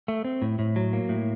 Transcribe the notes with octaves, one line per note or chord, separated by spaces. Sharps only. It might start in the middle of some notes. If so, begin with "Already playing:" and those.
A3
C4
A2
A2
F#3
A#3
A2